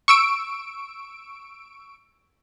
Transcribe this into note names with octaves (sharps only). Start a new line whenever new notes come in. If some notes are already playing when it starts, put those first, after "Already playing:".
C#6 E6 D7